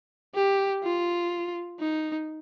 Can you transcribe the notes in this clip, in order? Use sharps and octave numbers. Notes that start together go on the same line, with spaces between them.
G4
F4
D#4